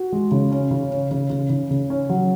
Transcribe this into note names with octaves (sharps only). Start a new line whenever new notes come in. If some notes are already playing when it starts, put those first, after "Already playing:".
Already playing: F#4
G#3
C#3
C#4
C#3
C#4
C#3
C#3
C#3
C#3
C#4
F#3